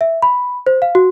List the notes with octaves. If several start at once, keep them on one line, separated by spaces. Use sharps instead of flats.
E5
B5
C5
F5
F#4